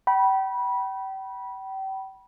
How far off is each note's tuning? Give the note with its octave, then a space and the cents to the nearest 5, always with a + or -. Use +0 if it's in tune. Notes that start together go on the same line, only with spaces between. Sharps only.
G5 -35 B5 -20